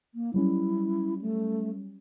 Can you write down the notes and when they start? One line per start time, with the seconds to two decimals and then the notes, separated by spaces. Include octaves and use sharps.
0.15 A#3
0.34 F#3 G3 C#4 E4
1.21 A3